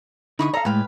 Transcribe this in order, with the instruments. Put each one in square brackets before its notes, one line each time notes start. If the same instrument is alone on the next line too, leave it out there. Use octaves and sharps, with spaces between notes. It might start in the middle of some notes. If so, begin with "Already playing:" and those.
[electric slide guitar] D3 D#4 E4 [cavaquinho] B5 C#6 D#6
[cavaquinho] A4 A#5 D#6 [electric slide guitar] D5 F5
[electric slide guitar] A2 G#3 G5 [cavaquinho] B4 F5